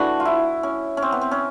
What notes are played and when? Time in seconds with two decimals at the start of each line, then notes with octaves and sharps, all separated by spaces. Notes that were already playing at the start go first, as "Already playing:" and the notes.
Already playing: E3 A3 D4 F#4
0.20 F4
0.25 E4
0.63 C#4
0.97 C#4
1.02 C4
1.12 B3
1.21 C4
1.31 C#4